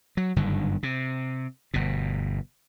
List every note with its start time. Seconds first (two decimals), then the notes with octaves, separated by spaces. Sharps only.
0.17 F#3
0.36 F#1 G2 D3 D#3
0.83 C3
1.74 G1 B2